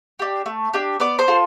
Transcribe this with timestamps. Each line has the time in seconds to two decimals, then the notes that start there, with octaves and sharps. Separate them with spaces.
0.19 D4 G4
0.46 A3
0.74 D4 G4
1.00 B3 D5 D6
1.19 C5 C6
1.28 F4 A4